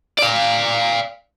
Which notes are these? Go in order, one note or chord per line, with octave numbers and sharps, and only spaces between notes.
D5 F5